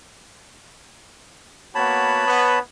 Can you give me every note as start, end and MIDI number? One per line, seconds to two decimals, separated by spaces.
1.75 2.25 58
1.75 2.25 59
1.75 2.25 66
1.75 2.59 73
1.75 2.59 81
1.75 2.59 83
2.26 2.58 59